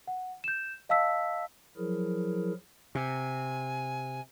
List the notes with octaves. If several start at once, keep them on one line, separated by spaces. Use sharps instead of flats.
F#5
G6 E7
D#5 F5 A5 E6 B6
F3 F#3 E4 G#4 A#4
C3 G#5